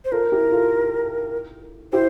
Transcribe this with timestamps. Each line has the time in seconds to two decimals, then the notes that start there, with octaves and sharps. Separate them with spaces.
0.05 C5
0.12 F4 A4 A#4
0.32 E4 G4
0.52 F4 A4
1.92 E4 G4 C5